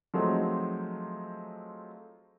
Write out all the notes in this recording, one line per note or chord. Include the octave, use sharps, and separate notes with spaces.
F3 F#3 G#3 A3 C4 D#4